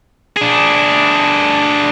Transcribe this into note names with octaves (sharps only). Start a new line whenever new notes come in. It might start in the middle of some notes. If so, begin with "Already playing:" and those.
D4 G#4